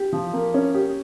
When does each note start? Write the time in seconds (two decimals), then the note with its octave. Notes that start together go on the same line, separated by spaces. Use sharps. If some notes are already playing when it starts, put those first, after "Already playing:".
Already playing: G4
0.13 F3
0.33 A#3
0.54 C#4
0.74 G4